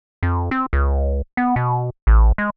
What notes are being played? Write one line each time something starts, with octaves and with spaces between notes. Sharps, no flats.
F2
C4
C#2
B3
B2
A1
G#3